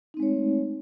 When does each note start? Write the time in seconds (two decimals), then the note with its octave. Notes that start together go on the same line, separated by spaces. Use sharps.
0.14 D#4
0.17 C4
0.20 G#3
0.23 C#5
0.25 A3